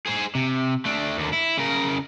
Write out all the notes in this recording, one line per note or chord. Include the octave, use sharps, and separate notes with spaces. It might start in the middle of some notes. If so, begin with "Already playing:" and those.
G#4 C5
C3
A3 D4
D#2 D3
E4
C#3 A#4